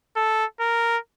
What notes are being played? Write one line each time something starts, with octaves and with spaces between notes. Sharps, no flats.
A4
A#4